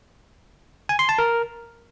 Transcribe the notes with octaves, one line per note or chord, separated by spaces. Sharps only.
G#5
C6
A5
A#4